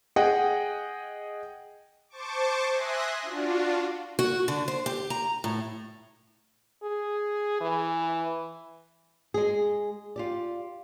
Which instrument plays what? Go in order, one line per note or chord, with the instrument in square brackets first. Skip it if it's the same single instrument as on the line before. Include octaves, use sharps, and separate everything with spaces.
[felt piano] G#4 D#5 F#5 G5
[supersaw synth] C5 A5 C#6 D6
E5 G#5 C6 D#6 F#6 A#6
D4 F4 F#4
[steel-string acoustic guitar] F#4
D3
C5
G4
A#5
A2
[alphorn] G#4
E3
[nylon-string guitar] G#3 G#4
F4 G4 D5